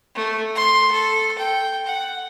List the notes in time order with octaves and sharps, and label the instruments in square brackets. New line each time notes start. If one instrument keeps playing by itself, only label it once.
[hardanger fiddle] A3
C6
A4
G5
F#5